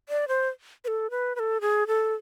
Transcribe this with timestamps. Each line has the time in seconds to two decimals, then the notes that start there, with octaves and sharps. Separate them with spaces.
0.09 D5
0.28 C5
0.84 B4
0.88 A4
1.11 B4
1.36 B4
1.39 A4
1.61 G#4
1.87 A4